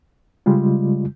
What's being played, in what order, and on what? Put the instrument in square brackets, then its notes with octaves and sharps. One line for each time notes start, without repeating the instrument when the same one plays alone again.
[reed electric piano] C#3 G3 G#3 F4